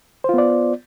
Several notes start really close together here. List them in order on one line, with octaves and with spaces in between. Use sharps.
C5 F4 B3 D5